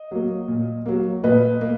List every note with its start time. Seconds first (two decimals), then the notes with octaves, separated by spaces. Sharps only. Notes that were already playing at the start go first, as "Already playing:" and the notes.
Already playing: D#5
0.11 F#3 A#3
0.48 A#2
0.86 F#3 A#3
1.24 A#2 B4 D#5
1.61 A#3